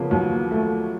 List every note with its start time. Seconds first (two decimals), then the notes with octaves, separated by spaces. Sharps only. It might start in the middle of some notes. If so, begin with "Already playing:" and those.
Already playing: C#3 F3 A#3 B3 C#4
0.10 D#2 F#3
0.51 A3